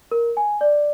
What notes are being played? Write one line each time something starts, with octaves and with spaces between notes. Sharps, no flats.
A#4
G#5
D5